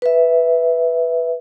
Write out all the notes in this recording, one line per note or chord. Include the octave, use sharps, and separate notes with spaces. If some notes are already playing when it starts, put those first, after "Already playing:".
B4 E5